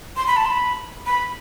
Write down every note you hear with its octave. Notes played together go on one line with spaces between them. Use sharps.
C6
B5
A5
C6
B5
B5